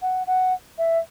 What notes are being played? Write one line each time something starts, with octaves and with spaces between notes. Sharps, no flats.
F#5
F#5
E5